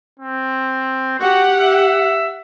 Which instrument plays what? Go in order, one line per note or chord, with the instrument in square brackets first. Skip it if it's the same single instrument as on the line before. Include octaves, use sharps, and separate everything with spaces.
[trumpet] C4
[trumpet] F#4 [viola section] G4 F#5
[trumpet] E5